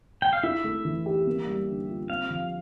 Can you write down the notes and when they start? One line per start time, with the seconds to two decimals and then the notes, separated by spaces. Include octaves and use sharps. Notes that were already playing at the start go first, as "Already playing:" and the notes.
0.22 G5
0.33 F5
0.43 E4 E5
0.64 A3
0.85 E3
1.06 G4
1.27 A#3
1.47 G3
1.67 D3
1.89 F4
2.09 C4 F5
2.30 F3